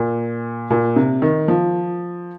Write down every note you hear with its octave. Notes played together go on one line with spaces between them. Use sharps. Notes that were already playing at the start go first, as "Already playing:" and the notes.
Already playing: A#2
A#2
C3
D#3
F3